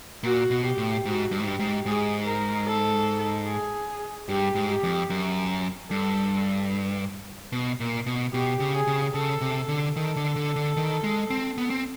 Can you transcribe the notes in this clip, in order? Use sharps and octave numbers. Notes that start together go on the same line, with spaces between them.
A#2 F#4
B2
G4
A2
G#2 F#4
G2
G#2
G2 G4
G#2
G#2 G#4
A#4
A4
G#4
G2 G4
G#2
G4
F2
F#2
G2 A4
B2
A#2
B2
B2 G4
C#3
G#4
C#3
C#3 A4
C3
D3
D#3 A4
D3
D3
D3
D#3
G#3
C4
B3
C4